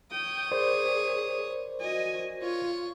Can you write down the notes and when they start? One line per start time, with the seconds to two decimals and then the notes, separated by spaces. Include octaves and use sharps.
0.11 C#5 G5 D#6
0.52 G#4 A#4 C5 D5
1.80 F#4 D#5 G#5
2.42 F4 C#5